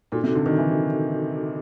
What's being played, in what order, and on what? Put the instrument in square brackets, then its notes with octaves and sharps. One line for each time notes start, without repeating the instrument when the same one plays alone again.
[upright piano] A#2 [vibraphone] D#4 F#4 A4
[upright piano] C3
D3
D#3
E3